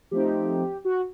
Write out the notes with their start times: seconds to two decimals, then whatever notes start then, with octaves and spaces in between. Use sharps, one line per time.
0.11 F3 A3 C4 D#4 G4
0.85 F#4